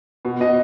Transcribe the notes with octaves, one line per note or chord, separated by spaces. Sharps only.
B2
B2 D#5